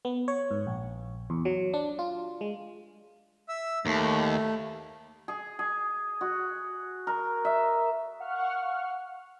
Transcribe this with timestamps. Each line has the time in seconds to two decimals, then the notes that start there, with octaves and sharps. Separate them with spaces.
0.05 B3
0.28 C#5
0.51 G#2
0.67 A#1
1.30 E2
1.45 F#3
1.74 D4
1.99 F4
2.41 G#3
3.49 E5 E6
3.86 D#2 A3
5.28 G#4
5.59 G#4
6.21 F#4
7.07 A#4
7.45 E5
8.19 F5 F#5 C#6 F6